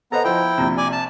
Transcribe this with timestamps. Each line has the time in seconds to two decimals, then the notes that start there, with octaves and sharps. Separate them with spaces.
0.12 B3 A4 C5 D#5 A#5
0.24 F3 E4 C5 G5
0.58 A#1 C3
0.77 D5 G#5
0.92 A5